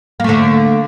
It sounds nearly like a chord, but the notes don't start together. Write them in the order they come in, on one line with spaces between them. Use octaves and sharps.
A#3 A3 D3